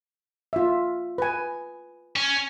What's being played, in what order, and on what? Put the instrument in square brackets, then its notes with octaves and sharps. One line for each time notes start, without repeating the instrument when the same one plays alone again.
[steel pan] F4 E5
B4 G#5
[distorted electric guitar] C#4